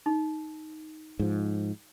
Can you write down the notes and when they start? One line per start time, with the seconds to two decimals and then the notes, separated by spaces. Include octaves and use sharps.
0.06 D#4
1.19 G#2 F3